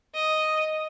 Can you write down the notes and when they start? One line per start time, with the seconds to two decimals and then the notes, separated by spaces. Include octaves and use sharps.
0.15 D#5